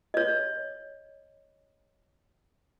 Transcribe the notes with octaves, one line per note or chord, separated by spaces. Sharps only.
C#5 D#5